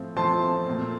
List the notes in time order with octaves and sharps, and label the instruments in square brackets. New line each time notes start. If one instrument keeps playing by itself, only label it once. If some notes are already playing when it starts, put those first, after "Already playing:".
Already playing: [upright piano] A2 F3 C4
A2 F3 C4 A5 C6
A#2 A3 C4